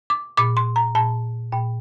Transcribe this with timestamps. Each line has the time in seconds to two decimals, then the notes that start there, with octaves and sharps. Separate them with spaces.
0.10 D6
0.37 A#2 D6
0.57 C6
0.76 A#5
0.95 A#2 A5
1.52 A#2 G5